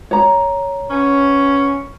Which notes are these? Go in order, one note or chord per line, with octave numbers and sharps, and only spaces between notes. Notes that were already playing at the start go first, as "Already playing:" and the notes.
C#5 A#5
B3 C#4